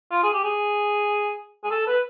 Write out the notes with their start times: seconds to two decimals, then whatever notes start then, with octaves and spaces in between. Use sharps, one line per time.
0.11 F4
0.23 G#4
0.34 G4
0.44 G#4
1.64 G#4
1.71 A4
1.87 B4